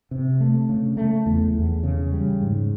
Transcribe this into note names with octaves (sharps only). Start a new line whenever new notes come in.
C3
A3
C#3
A3
E2
E2
C#3
G3
G#2